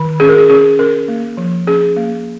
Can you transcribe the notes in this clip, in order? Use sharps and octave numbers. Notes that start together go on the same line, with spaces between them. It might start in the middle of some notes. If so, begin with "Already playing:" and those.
Already playing: D#3
C#4 G#4
A#4
G#4
C#4 G#4
C#4 A#4
A#3
F3
C#4 G#4
A#3